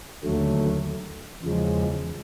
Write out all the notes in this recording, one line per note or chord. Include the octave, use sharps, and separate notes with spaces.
D#2 D3 F#3 A3
E2 C#3 F3 G#3